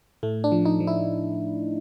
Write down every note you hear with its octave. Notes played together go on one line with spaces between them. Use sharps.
A2 A3
D4
F3
D#4
F3
E4